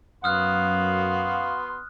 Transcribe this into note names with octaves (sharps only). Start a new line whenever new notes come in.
F#2 B3 F#4 F5 C6 D#6 F6 F#6